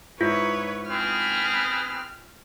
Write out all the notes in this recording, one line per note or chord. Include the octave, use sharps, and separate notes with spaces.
G#2 E4 F4 B4 C#5 B6
C4 G#4 B4 F6